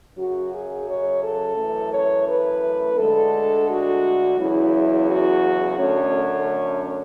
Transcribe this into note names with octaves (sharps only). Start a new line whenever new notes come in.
F#2 C#3 F#3 F#4
G#4
C#5
A4
F#2 E3 A3
C#5
B4
D2 D3 G#3 A4
F#4
E2 C#3 F#3 E4
F#4
F#2 D3 A3 C#4 C#5